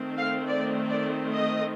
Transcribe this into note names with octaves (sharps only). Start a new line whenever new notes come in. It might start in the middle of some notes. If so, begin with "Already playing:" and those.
Already playing: D#3 A3 C4
F5
D5
D5
D#5